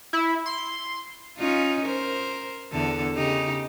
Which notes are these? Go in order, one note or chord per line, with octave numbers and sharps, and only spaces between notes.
E4
C6
C#4 D#4 F4
A#4 C5
E2 D3 A4
C#3 D#4 G4